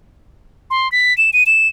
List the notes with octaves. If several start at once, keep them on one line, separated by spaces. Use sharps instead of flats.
C6
B6
E7
D#7
E7